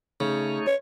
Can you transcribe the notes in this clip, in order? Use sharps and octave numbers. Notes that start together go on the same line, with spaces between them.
C#3 A3 D#4 C#5
C#5